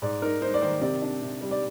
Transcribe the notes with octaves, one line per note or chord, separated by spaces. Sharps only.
G#2 D5
D#4 A#4
D#4 C5
D5
D#3 C5
C3 D5
D4
C3
G3
D5